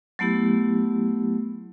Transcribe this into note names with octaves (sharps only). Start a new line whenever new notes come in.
F#3 A3 B3 E4 G4